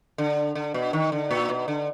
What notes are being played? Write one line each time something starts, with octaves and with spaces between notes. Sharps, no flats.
D3
D3
B2
D#3
D3
A#2
B2
D3